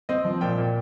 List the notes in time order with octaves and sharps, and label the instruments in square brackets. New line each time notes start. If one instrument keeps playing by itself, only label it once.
[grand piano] C4 D#5
F3
A#2 G5
A#2